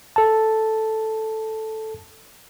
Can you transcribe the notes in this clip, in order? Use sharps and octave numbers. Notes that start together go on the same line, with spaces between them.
A4 A5